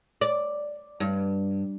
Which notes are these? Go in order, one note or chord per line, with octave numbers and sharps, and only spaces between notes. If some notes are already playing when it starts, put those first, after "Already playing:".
D5
G2